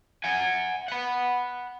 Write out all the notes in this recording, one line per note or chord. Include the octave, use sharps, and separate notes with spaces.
F#5 G#5
F#5 B5